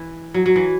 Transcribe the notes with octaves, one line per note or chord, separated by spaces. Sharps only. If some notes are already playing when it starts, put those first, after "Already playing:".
Already playing: E3
F#3
F#3
E3